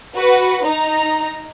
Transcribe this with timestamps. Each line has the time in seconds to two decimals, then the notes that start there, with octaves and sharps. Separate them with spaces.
0.15 F#4 B4
0.64 D#4 A#5